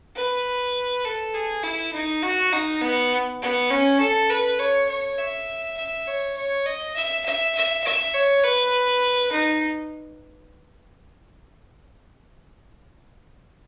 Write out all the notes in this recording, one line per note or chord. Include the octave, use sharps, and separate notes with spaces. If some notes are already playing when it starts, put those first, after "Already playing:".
B4
A4
G#4
E4
D#4
F#4
D#4
B3
B3
C#4
A4
B4
C#5
C#5
E5
E5
C#5
C#5
D#5
E5
E5
E5
E5
C#5
B4
D#4